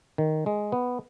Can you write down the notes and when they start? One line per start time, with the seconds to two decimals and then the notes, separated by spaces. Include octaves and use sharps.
0.18 D#3
0.46 G#3
0.72 B3